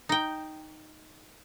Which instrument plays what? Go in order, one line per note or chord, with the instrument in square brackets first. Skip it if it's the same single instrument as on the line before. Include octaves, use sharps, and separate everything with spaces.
[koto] D#4 G5